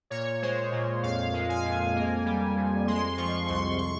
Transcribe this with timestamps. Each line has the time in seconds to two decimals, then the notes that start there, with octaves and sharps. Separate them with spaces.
0.10 A#2 C#5
0.42 G#3 C5
0.72 A#2
1.03 F2 F5
1.34 G#3
1.49 G#5
1.65 F2
1.95 A#3
2.25 G3
2.56 F2
2.87 G#3 C6
3.17 F3 C#6
3.48 C2 C6
3.79 C#6